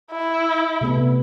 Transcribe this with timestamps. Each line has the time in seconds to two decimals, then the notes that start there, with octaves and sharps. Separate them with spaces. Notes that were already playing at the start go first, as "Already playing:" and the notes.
0.12 E4
0.81 C3 A3 B3